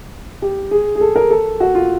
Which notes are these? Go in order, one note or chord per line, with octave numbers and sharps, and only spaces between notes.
G4
G#4
G#4
A4
A#4
A4
F#4
F4